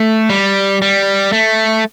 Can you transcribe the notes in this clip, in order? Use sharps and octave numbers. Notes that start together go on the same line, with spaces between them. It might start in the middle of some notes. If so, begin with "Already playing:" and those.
Already playing: A3
G3
G3
A3